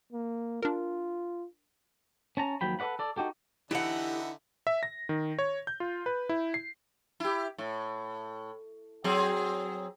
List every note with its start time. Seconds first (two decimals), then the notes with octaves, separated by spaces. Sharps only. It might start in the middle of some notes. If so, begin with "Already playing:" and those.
0.13 A#3
0.63 D4 F4 A#4
2.37 C#4 A5 A#5
2.61 D#2 F3 F#3 G5 B5
2.79 A4 B4 D5 F#5 B5
2.99 A4 D5
3.16 D#4 F#4 G4 A4
3.71 D3 E3 D#4 E4 G4 A4 E5 F#5
4.67 E5
4.83 A#6
5.09 D#3
5.39 C#5
5.67 G6
5.80 F4
6.06 B4
6.29 E4
6.54 C7
7.20 E4 G4
7.58 A2
9.04 F#3 C4 G#4